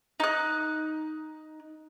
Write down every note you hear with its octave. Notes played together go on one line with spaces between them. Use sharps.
D#4 F#6